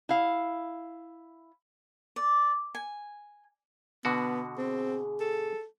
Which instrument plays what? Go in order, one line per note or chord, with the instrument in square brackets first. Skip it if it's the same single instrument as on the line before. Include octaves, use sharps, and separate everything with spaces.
[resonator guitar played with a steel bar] E4 F5
[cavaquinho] D5
G#5
[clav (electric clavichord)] B2 D3 F#4 [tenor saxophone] B3
[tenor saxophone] C4 [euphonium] G#4
[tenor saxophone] A4